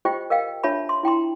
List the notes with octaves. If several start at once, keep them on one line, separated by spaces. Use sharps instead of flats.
F4 G4 C5 D#5 G5
A#4 D#5 F5 G5
D4 F4 C#5 E5 A5 B5
C6
E4 G5 A#5 C6